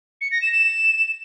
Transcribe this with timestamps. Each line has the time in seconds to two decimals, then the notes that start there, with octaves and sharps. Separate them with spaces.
0.21 C#7
0.31 A#6
0.42 E7
0.52 E7